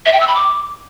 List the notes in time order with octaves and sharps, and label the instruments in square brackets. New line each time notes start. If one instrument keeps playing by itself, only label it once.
[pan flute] E5
G5
E6
B5
D6